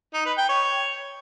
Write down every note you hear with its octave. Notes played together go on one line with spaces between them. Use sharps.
D#4
B4
G5
C#5